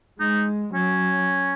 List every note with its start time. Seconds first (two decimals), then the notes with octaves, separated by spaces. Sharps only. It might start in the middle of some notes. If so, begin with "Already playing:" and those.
0.20 G#3 D#4
0.74 F#3 C#4